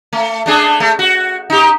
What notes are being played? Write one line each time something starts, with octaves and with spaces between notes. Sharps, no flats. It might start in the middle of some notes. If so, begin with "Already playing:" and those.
A3
A3 D4 G#4
A3
F#4
D#4 G4